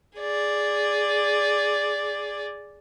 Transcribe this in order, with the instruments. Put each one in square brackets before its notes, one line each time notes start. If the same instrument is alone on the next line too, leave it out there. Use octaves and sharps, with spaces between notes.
[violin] G#4 D5